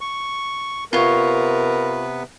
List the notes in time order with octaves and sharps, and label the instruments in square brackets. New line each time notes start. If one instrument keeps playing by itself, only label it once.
[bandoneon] C#6
[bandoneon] C3 B3 B4 [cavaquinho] F4 C#5 [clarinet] A#4